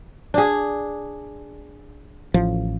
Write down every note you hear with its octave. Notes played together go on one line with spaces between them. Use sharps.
D4 G#4
A1 F3